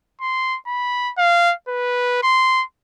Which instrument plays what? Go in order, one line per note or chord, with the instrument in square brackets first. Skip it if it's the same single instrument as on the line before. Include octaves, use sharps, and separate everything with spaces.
[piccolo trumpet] C6
B5
F5
B4
C6